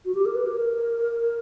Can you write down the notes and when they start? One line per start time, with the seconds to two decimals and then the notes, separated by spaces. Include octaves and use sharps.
0.05 F#4
0.15 G4
0.26 A#4
0.35 B4
0.46 A#4